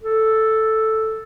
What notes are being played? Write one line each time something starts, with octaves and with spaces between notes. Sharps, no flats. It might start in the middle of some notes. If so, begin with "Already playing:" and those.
A4